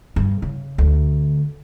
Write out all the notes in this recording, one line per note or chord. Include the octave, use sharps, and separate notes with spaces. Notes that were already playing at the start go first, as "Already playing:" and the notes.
G2
C#3
D2